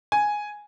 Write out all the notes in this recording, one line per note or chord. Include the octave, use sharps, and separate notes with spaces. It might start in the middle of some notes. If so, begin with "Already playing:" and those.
G#5